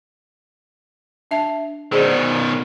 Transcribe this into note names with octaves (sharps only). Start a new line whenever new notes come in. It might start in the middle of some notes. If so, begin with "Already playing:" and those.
D4 E5 A5
B2 D#3 G#4 C5 D5